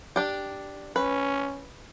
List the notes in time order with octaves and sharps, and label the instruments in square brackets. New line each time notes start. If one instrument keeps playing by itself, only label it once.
[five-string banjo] D4 G4
[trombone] C#4 [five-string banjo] B4